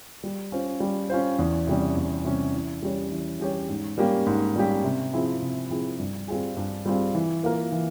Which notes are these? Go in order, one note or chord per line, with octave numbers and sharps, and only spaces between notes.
G3
C#4 F4 C5
G3
C#4 F4 C5
E2
C3 G3 C#4
E2
C3 G3 C#4
E3
G3 C#4 G4 C#5
E3
G3 C#4 G4 C#5
G#2
G3 A#3 C#4 G4
G#2
G3 A#3 C#4 G4
C3
F3 C4 E4 G#4
C3
F3 C4 E4 G#4
G2
G3 C4 F4 G#4
G2
G3 C4 F4 G#4
E3
A#3 F4 A#4
E3